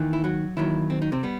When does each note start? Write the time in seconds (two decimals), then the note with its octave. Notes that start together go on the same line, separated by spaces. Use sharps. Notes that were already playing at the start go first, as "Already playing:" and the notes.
Already playing: D#2 D#3 E3
0.13 E4
0.24 F#3 F#4
0.57 D#2 D#3 E3 F#3 E4
0.90 C4
1.02 D#4
1.12 C3 C4
1.23 G3 B3